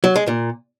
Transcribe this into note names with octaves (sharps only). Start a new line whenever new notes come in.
F#3
G#3
A#2